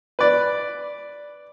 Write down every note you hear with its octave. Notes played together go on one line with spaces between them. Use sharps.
B4 D5